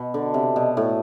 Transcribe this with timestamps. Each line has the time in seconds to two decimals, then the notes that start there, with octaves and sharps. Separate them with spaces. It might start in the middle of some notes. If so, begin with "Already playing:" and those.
Already playing: B2
0.14 D3
0.34 C3
0.56 B2
0.77 A2